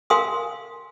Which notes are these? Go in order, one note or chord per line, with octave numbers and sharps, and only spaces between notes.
A#4 F5 G#5 C6 D#6